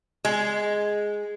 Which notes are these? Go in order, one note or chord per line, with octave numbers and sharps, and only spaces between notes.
G#3